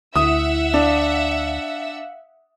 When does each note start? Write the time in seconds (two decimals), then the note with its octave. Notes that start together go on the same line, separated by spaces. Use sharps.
0.16 D2 E4 E5 F#5 D#6 E6
0.74 D4 F5